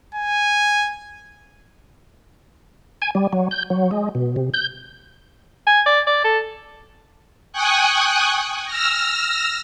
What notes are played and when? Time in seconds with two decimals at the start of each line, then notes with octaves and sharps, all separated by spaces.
0.15 G#5
3.02 G#5
3.15 G3
3.33 F#3
3.51 G6
3.70 F#3
3.91 G#3
4.15 B2
4.36 C3
4.54 G6
5.67 G#5
5.86 D5
6.07 D5
6.25 A4
7.53 G5 G#5 C#6 D#6 F#6
8.66 E6 F6 A#6